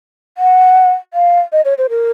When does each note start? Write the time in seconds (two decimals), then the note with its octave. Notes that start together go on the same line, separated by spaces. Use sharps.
0.38 F#5
1.14 F5
1.52 D#5
1.65 C#5
1.78 C5
1.90 A#4